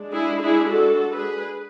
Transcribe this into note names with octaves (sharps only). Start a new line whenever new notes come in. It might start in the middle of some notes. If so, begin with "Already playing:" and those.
Already playing: G#3 D4
E4 G#4
E4 G#4
F#4 A4
G#4 B4